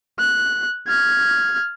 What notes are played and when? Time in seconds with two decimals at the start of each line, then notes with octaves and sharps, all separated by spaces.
0.19 F#6
0.88 F6 G#6